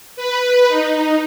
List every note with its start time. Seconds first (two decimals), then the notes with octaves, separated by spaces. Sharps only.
0.16 B4
0.69 D#4